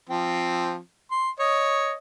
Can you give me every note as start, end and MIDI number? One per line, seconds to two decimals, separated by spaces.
0.09 0.78 53
0.09 0.78 60
1.11 1.30 84
1.39 1.96 73
1.39 1.96 75